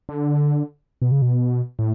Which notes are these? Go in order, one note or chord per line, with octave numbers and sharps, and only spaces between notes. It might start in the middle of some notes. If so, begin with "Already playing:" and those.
D3
B2
C#3
B2
A2